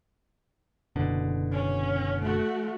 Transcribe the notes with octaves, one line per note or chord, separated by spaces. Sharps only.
F#1 B2 D3
C#4
A3 F#4